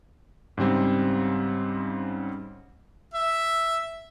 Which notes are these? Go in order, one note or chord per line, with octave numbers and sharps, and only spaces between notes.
G#2 C#3 G3 C4
E5